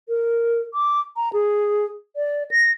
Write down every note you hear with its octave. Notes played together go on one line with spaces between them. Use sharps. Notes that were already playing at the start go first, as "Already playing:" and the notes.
A#4
D6
A#5
G#4
D5
A#6